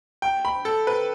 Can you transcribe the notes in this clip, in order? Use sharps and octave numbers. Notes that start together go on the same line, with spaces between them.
G5
B5
A4
B4